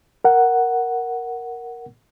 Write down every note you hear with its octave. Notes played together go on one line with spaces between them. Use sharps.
A#4 F#5